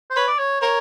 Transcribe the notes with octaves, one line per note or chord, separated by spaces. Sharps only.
C5
B4 C#5
D5
C#5
A#4 C#5